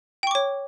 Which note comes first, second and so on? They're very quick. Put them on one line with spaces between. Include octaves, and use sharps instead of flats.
G5 C#6 D6 C#5